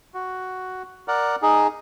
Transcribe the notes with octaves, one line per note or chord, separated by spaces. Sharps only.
F#4
A#4 D5 F#5
D#4 G#4